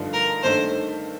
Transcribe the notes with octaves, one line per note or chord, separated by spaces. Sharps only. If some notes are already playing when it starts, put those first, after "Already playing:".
Already playing: G2 D3 F3 A3 D#4
A#4
G2 D#3 A3 D4 C5